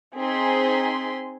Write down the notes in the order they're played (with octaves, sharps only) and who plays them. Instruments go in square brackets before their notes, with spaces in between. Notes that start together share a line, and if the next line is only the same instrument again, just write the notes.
[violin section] C4 D#4 G#4 G#5 C6 B6